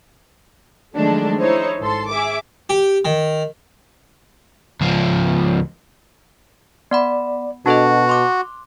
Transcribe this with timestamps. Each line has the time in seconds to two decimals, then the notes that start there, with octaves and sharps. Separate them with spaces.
0.95 D#3 F3 F#3 G#3 A3 D4
1.40 D#4 E4 C5 C#5
1.80 G#1 A4 C6
2.10 G#4 E5 D6
2.70 G4
3.05 D#3
4.81 C#2 F3
6.91 B3 D5 F#5 B5
7.66 B2 D4 F#4 A4 D#5 A5
8.09 C6 D6 F#6